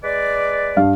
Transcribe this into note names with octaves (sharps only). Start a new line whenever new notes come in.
G#3 B4 D5
G2 D4 F5